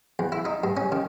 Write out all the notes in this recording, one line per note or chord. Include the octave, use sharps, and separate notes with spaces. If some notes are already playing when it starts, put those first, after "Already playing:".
E2
E4
D#4
G2
C#4
D#3